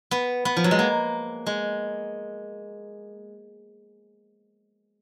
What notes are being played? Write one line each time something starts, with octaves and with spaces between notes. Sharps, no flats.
B3
B3
F3
F#3
G#3
A#3
G#3